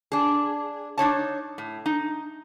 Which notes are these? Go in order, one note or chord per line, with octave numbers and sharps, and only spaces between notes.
D4 G#4
D4 D#4 C#5 A5
A2
D#4